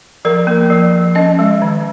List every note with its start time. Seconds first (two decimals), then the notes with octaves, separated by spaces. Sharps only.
0.25 F3 A#4
0.47 A#3
0.70 F3
0.93 F3
1.15 C#4 D#5
1.39 G#3
1.62 D#3